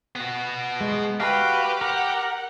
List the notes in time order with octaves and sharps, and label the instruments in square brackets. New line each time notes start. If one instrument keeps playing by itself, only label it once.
[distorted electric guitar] B3 F#4
[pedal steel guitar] G#3
[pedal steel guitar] F#4 F5 [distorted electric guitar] G4 [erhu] B4
[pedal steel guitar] A#4 [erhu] F#5